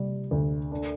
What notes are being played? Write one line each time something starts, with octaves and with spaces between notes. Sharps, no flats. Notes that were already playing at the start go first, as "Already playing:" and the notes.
Already playing: C3 G3
D2
D4